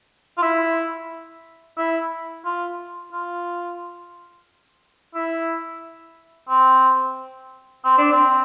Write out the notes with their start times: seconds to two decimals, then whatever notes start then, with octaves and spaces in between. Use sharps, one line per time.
0.38 F4
0.42 E4
1.78 E4
2.45 F4
3.12 F4
5.15 E4
6.49 C4
7.85 C4
7.98 D4
8.12 C4